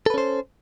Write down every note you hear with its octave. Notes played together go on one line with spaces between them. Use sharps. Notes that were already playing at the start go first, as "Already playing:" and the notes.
C#4 A4 B4 C5